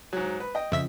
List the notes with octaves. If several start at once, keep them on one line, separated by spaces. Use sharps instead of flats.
G#2 F#3
B4
D#5 G5
F2 C#3 F3 E5 B6